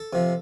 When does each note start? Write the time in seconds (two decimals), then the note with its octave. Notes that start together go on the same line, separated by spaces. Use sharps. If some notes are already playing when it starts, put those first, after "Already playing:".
Already playing: A4
0.13 C3 F3